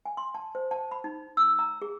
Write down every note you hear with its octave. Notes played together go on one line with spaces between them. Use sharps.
G#5
C6
A5
C5
A5
B5
D#4
E6
A#5
G#4